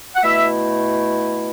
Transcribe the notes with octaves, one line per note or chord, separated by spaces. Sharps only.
F#5
B2 A3 E4 E5